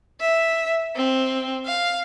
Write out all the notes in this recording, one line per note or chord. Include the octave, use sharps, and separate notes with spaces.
E5
C4
F5